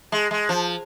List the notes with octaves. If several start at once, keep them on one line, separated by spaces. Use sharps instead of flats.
G#3
G#3
F3